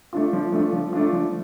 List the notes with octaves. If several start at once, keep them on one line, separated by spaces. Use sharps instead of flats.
A3 D4 F4
F3
A3 D4 F4
F3
A3 D4 F4
F3